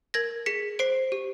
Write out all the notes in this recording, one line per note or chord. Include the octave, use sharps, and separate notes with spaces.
A#4 G#6 A#6
G#4 B6 C#7
C5 C7 D7
G4